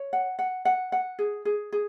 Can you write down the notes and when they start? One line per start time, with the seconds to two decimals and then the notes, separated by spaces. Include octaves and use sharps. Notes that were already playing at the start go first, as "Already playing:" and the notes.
Already playing: C#5
0.13 F#5
0.39 F#5
0.65 F#5
0.92 F#5
1.19 G#4
1.45 G#4
1.72 G#4